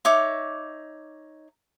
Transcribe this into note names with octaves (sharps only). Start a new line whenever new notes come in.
D#4 C#5 E5 D6